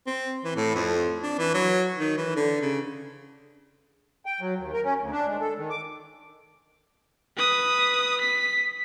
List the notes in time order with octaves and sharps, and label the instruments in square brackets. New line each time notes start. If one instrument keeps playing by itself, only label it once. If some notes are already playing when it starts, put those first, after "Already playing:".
[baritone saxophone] C4
E3
A2
F2
D4
E3
F#3
D#3
E3
D3
C#3
[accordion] G5
F#3
D#2
A#4
C#4
D2
D4
G#3
A4
D#3
D6
[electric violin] B4 D#6
B6